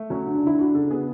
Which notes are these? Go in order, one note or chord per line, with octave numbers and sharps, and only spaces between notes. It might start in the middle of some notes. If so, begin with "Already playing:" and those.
Already playing: A3
F#3 C#4
D3
D4
D3 E4
D4 F#4
C#3 A4
B3 G#4